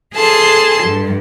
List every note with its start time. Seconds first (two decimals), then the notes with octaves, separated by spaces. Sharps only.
0.14 G#4 A4 A5 C6
0.83 G2